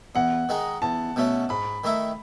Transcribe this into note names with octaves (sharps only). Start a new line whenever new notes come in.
E2 F#5
D#3 G#3 D#4
E2 A5
B2 A3 C#4
G#2 B5
D#3 A3 E4